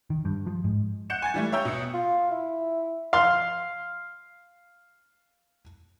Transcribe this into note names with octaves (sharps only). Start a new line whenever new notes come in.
D#3
G2
F3
G#2
F#5 F#6 G6 C#7 E7
G#5 G#6 A6
E3 G3 A3
C#5 E5 G5 A#5 E6 G6
B2 D#6 C#7
F4
E4
F5 C6 F6